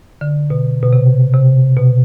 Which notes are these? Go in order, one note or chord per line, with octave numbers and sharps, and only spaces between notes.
D3
B2
B2
C3
C3
B2